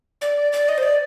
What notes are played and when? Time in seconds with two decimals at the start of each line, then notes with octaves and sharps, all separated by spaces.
0.21 D5
0.53 D5
0.69 D#5
0.78 C5
0.83 D5